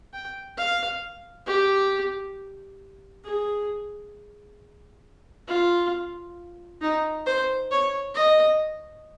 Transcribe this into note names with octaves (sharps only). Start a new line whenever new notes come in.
G5
F5
G4
G#4
F4
D#4
C5
C#5
D#5